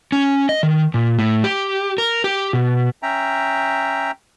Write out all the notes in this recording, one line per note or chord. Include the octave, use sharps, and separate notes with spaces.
C#4
D#5
D#3
A#2
A2
G4
A#4
G4
B2
C#4 E5 G5 A#5